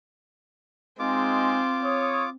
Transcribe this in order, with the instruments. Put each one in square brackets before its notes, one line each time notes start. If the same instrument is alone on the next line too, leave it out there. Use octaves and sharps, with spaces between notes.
[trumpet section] G#3 D#4 [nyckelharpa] C4 [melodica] F4 D6
[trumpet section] C#5 D#6